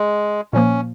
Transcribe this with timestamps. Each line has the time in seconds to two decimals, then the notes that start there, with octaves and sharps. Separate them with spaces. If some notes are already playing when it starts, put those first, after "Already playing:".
Already playing: G#3
0.53 A#2 F3 A#3 C#4